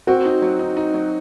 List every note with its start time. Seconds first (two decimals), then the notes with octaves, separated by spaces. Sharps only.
0.07 C4 F#4
0.25 D#4
0.42 F#3
0.59 D#4
0.77 D#4
0.94 F#3